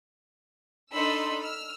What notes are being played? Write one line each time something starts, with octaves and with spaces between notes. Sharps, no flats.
D4 D#4 A4 B5 C6 E6
E6 F6